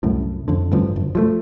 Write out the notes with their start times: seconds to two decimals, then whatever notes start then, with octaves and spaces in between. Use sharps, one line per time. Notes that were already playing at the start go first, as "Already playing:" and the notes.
0.03 C2 F#2 A2
0.48 F2 D3
0.72 A1 G2 D3 F3
0.96 F#1
1.15 F3 F#3 A3